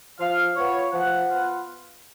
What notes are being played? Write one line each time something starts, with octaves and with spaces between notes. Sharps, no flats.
F3 F5
B3 F4 C#5
F3 F#5
B3 F4